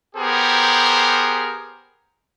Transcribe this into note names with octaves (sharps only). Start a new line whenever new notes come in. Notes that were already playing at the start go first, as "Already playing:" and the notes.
B3 G4 G#4 A#4 C5